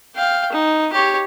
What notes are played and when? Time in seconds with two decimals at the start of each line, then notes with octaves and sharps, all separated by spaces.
0.15 F5 G5
0.52 D#4
0.93 G4 C#5